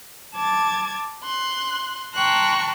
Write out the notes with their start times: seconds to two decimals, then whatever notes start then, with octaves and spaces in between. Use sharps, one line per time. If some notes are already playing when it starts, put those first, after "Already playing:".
0.34 A5 D6 G#6 A6
1.22 C6 F#6
2.15 G5 A5 A#5 C6 C#6 F#6